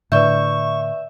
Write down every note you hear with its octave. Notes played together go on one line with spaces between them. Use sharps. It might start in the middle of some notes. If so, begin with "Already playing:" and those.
A2 D3 B4 D5 E5 C#6 G6